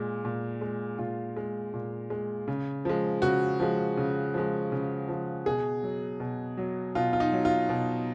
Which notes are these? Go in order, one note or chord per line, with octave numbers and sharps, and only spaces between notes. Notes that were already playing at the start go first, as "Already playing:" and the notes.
Already playing: A#2 G#3
A#2
G#3
A#2 F4
G#3
A#2
G#3
C#3
F3 G#3
C#3 F#4
F3 G#3
C#3
F3 G#3
C#3
F3 G#3
B2 G#4
F#3
B2
F#3
B2 F4
F4
D#4
F#3
F4
B2